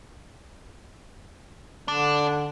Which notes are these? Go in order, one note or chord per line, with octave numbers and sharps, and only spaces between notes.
D3 D4